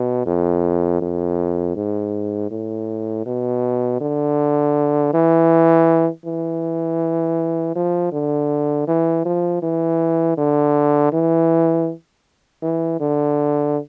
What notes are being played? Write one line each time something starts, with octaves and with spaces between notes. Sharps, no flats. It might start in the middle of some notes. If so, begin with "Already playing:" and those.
Already playing: B2
F2
F2
G#2
A2
B2
D3
E3
E3
F3
D3
E3
F3
E3
D3
E3
E3
D3